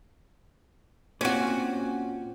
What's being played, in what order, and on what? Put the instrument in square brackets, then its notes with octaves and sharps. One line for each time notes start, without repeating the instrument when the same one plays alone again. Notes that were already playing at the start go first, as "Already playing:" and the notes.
[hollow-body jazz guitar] A#2 C4 [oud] C#4 F#4